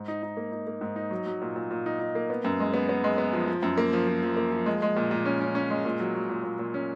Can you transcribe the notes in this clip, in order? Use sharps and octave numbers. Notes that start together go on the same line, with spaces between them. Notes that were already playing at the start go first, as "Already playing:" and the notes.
Already playing: G#2
D#4
D#4
A#3
D#4
A#3
G#2
D#4
F#3
F#3
A#2
A#2
A#2
D#4
D#4
A#3
B3
F#2
G#3
B3
B3
G#3
B3
F3
F3
F#2
A#3
F3
F3
F3
A#3
F3
G#3
G#3
A#2
A#2
C#4
C#4
C#4
G#3
A#2
F#3
F#3
A#2
A#2
A#2
C#4